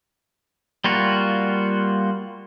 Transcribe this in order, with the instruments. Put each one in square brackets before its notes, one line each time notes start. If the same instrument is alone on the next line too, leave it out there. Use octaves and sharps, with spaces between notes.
[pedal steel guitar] G3 A#3 F4 F#4